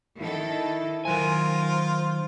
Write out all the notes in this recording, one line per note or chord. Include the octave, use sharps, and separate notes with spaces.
D#3 E4 A4
D#3 F#3 F4 A#4 C5 G#5